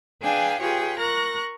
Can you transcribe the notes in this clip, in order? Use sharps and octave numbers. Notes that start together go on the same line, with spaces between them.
D4 G#4 B4 F5 G5 G#5
F4 G4 G#4 B4 C#5 G5
A#4 A#5 C#6 F#6 A#6